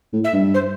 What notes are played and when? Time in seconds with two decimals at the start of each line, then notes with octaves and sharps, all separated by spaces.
0.13 A2
0.24 E5
0.33 G2
0.54 C5